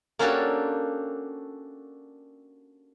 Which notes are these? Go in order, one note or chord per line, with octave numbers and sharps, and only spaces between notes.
A#3 C#4 D4 F#4 G4 A4